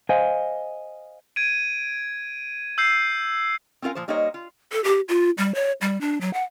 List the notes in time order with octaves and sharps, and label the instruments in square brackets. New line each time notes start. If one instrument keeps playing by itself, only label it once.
[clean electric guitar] C5 D#5 F5 G#5
[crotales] G#6 D7 D#7
E6 G6 C7
[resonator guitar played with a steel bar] C4 C#4 F4 A#4 F5 G#5
A#2 F3 C5
G3 A#3 D#4 C5 C#5 D#5
F4
[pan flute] A4
G4
F4
G3
C#5
G3
D4
F#3
F#5